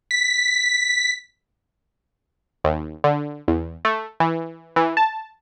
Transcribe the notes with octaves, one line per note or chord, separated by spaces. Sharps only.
B6
D#2
D3
E2
A3
E3
E3
A5